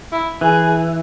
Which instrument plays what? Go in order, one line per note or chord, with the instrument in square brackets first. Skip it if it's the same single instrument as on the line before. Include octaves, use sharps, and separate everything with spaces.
[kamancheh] E4
[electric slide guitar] E3 [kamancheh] G#4